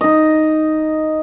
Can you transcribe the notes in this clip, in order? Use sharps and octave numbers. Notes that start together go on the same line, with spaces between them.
D#4 D#5